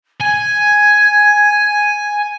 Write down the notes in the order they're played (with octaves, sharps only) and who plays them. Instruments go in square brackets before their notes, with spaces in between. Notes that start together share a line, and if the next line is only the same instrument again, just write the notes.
[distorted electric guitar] G#5 [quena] G#6